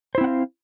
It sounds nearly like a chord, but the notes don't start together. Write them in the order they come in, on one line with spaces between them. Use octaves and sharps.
C5 E4 C4 F#5 F5